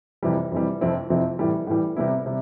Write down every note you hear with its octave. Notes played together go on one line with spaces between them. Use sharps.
F2 C3 E3 G3
F2 C3 E3 G3
F2 C3 F3 C4 E4
F2 C3 F3 C4 E4
A2 E3 G3
A2 E3 G3
C3 G3 B3 E4
C3 G3